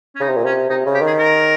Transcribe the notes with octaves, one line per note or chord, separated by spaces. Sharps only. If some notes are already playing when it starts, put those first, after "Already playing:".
C#4
C#3 D#4
C3
A#2
C3 C#4
C3 D#4
C#3
G4
D#3 G#4
A#4